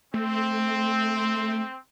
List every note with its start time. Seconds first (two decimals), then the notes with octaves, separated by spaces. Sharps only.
0.14 A3 C4